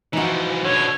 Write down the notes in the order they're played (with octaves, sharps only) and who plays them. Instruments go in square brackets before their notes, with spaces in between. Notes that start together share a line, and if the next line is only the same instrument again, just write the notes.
[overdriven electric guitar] E3 F3 [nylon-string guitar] D#4 F#4
[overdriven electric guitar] B2 D3 [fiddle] C#5